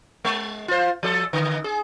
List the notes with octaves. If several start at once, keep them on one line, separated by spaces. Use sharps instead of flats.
G#3
F4 C5
F3 A4
D3
G#4